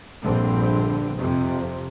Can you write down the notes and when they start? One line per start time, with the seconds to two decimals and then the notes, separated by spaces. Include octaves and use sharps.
0.22 A#1 G2 D3 C4
1.18 F2 C3